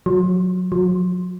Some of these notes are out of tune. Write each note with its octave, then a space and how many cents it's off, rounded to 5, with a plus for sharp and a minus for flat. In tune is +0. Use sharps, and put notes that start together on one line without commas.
F#3 -20
F#3 -40